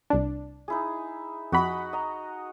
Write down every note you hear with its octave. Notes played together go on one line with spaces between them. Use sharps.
C2 D4
D#4 E4 G#4
F2 F#4 D#5 F#5 B5
D#5 A#5